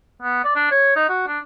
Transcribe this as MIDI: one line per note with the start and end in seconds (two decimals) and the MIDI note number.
0.22 0.43 59
0.44 0.55 74
0.55 0.67 62
0.71 0.94 73
0.96 1.06 63
1.09 1.22 66
1.27 1.39 62